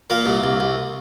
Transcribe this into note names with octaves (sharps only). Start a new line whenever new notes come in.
A#2 A#3
C2
C2
C2